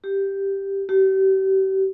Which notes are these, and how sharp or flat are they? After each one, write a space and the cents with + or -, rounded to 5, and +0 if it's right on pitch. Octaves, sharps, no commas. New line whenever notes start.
G4 +0
G4 -35